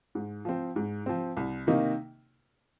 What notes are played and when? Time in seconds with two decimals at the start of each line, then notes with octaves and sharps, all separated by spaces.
0.15 G#2
0.45 F3 C4
0.76 G#2
1.06 F3 C4
1.37 C2
1.67 C3 D#3 A#3 D#4